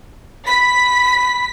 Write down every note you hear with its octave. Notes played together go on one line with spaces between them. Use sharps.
B5 B6